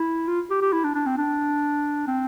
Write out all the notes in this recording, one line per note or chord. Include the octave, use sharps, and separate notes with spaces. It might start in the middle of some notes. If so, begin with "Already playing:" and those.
Already playing: E4
F4
G4
G4
E4
D4
D4
C4
D4
C4